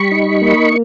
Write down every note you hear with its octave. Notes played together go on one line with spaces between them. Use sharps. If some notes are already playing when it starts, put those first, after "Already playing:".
Already playing: G3 B5 C#6
D#4
A#3